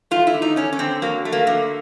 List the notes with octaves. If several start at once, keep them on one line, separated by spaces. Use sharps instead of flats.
A3 F4
E4
D3
D#4
D3 C#4
C#4
D3 C4
F#3 A#3
A3
A#3
D3 A#3